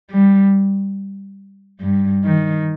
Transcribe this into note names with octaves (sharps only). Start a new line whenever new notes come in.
G3
G2
D#3